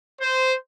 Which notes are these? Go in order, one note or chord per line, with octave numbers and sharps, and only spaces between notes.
C5